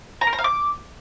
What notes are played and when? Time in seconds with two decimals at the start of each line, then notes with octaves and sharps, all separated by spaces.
0.21 A#5
0.27 A#4
0.33 A#5
0.39 F5
0.44 D6